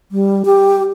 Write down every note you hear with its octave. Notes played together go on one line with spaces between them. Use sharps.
G3
G4